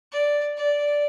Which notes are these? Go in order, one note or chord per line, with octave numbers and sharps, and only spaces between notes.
D5
D5